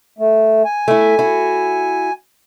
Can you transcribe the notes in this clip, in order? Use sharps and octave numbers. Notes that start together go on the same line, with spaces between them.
A3
G#5
A3 E4
E4 F#4